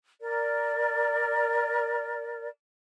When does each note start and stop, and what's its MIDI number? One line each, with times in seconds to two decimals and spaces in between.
0.21 2.48 70
0.21 2.48 74